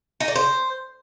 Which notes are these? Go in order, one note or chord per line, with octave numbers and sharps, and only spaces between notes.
D#4
D5
C5